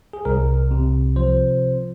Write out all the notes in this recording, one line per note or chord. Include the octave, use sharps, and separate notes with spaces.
G#4
C2 A#4
C3
F3 C5